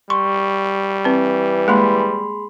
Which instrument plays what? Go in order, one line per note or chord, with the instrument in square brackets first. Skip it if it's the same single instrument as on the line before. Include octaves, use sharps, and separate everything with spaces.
[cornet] G3 [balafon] C6 [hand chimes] C#6
[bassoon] E3 [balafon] C4
[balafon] G#3 A#3 [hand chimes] G#4 B5 C6